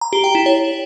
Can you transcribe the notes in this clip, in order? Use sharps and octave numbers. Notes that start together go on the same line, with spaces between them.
A#5
G4
G5
E4
C#5